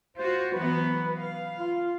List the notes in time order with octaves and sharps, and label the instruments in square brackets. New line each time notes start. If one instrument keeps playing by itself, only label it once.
[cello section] F4 F#4 [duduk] C5
[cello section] E3 F#3 B3 [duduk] B4
[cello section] F5
[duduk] F4